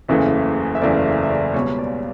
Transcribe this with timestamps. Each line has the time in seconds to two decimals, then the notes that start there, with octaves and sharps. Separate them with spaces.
0.08 F#1 E2 C#3 E3 A3 E5
0.75 E5
0.82 F#1 E2 C#3 E3 A3 D5
1.06 E5
1.23 E5
1.30 D5
1.54 C#2 B2 G3 B3 C#5
1.79 D5